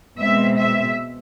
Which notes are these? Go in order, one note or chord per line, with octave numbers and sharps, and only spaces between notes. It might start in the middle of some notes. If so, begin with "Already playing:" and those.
B2 G#3 C4 E5
E5